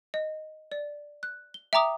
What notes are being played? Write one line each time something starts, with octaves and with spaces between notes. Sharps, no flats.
D#5
D5
F#6
G7
E5 G5 A#5 D6 D#6